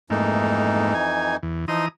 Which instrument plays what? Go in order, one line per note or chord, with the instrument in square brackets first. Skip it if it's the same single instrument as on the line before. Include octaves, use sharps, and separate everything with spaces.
[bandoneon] F2 E3 D#4 [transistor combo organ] G#2 A3 A#3
[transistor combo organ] G#5
E2
[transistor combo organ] E3 A#5 D#6 [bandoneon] F3 D#4 C6